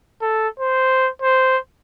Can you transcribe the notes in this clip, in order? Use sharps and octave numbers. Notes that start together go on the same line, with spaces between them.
A4
C5
C5